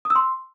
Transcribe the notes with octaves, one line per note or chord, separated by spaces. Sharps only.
D#6
E6
C6